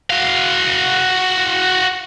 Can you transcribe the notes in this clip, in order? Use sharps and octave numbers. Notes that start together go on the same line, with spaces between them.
F#4 F5